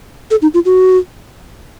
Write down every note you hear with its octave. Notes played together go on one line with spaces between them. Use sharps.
A4
D#4
F4
F#4